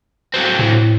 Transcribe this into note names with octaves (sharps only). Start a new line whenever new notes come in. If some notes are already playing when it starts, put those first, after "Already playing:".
F#3 C4
A2